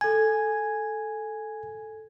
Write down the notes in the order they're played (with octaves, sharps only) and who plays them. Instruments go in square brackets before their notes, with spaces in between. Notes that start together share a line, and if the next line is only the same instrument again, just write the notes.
[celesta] A4 G#6 [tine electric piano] G#5